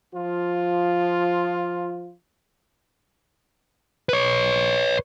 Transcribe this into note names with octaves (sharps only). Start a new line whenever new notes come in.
F3 F4
B4 C#5